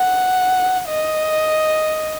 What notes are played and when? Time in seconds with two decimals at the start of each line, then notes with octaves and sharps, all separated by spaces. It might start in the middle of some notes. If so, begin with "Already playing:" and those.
Already playing: F#5
0.88 D#5